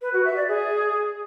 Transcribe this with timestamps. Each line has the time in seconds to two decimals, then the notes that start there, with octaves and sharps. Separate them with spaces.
0.02 B4
0.13 F#4
0.25 E5
0.37 D5
0.48 G#4